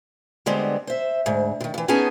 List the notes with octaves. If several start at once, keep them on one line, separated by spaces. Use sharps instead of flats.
D3 G3 G#3 B3 C4
C5 E5
D2 G#2
C3 D#3
C#3 E3
B3 C#4 D#4 G#4 G#5 A5